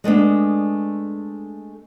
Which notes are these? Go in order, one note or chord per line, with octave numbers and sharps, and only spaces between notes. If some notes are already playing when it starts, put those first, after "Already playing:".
G#3 A3 B3 D4